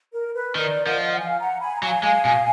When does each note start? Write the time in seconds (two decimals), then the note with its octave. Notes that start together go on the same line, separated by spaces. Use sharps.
0.12 A#4
0.34 B4
0.55 D#3 A#4 D5
0.87 F3 D#5 F#5
1.13 F#5
1.19 F5 G#5
1.39 F#5 A#5
1.60 G#5 B5
1.75 A#5
1.82 F#3 F5 G#5
2.03 G#3
2.25 B2